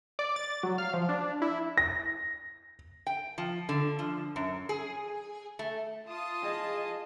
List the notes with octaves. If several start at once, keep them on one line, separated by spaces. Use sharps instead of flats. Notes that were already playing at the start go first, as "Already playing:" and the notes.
D5
A6
F#3
F5
F3
D4
E4
A#6
G5
F3
D3
F3
F#2
G#4
A3
F4 A5 D#6
G#4 D#5